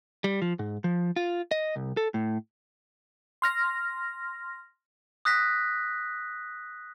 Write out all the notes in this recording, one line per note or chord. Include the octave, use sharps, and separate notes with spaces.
G3
F3
G#2
F3
F4
D#5
C2
A4
A2
C6 F6 A#6
D#6 F#6 A#6 B6